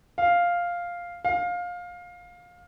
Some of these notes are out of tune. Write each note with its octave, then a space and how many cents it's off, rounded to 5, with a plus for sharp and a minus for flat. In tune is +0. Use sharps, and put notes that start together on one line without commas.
F5 +0
F5 +20